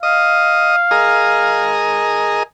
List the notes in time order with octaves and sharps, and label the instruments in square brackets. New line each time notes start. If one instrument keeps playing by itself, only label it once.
[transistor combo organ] D#5 [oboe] F5
[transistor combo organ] G#4 A#4 D#5